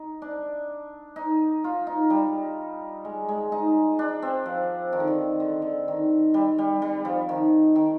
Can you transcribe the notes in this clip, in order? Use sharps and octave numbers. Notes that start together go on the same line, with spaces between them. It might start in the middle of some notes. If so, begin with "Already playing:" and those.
Already playing: D#4
D4
D#4
F4
D#4
G3
G#3
G#3
D#4
D4
C4
F3
D#3
D3
D#3
D3
D3
D#3
G3
G3
G3
F3
D#3
D#3